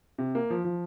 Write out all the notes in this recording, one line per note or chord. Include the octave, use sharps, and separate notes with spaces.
C3
A#3
F3
F3